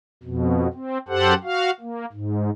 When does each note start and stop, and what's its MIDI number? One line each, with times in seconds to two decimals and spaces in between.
0.23 0.68 41
0.23 0.68 47
0.73 0.98 60
1.08 1.34 42
1.08 1.34 67
1.08 1.34 69
1.08 1.34 72
1.08 1.34 78
1.43 1.71 66
1.43 1.71 77
1.80 2.06 58
2.13 2.50 44